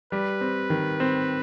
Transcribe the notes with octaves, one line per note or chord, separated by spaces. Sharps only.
G3 B4
C4
D#3
C4